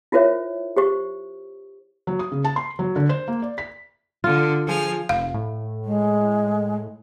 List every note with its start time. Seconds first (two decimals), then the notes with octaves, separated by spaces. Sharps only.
0.12 E4 F4 A#4 C5 C#5 E5
0.76 G4 C5 C#6
2.07 F#3
2.19 D#6
2.32 C#3
2.44 A5
2.56 C6
2.79 F#3
2.96 D3
3.09 C5
3.28 A#3
3.42 D5
3.58 B6
4.24 D3 F4
4.65 F3 G#4 F6
5.09 F1 F5
5.34 A2
5.85 G#3